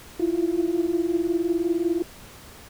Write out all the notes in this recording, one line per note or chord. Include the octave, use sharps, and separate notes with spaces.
E4 F4